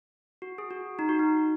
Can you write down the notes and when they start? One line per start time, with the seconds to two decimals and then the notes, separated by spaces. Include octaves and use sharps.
0.42 F#4
0.58 G#4
0.71 F#4
0.99 D#4
1.09 F#4
1.19 D#4